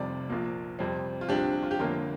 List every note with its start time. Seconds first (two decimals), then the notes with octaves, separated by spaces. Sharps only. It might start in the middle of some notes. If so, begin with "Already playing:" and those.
Already playing: F1 F2 C3 G3 D5
0.29 A#1 A#2 F3 A#3
0.79 F2 C3 G3 C4
1.21 F4
1.29 A#1 A#2 G3 C4 D4 G4
1.63 F4
1.71 G4
1.79 G1 F2 D3 A#3 F4 A#4